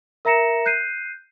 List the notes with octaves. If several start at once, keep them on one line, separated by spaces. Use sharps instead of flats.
A#4 E5 A#5 A#6 C#7 E7
F#6 G6 C7 D#7